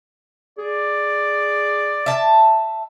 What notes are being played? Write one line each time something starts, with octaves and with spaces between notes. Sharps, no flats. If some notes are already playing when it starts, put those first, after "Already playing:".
G#4 D5
E5 A5